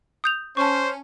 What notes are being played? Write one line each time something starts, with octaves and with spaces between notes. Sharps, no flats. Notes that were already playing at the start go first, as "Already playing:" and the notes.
D#6 G6 F7
C#4 C5 A5 C#6